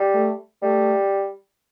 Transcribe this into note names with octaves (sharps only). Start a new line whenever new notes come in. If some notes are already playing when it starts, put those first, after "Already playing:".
Already playing: G3
A3
G3 A3